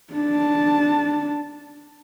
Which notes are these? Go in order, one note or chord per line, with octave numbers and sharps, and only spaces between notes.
D4 A5